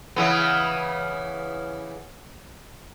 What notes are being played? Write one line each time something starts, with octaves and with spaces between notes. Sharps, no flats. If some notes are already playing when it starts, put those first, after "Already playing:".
C#3 E3 B3